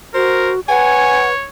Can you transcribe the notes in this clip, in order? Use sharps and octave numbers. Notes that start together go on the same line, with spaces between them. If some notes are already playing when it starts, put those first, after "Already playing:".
F#4 A#4 C5
B4 C#5 F#5 G#5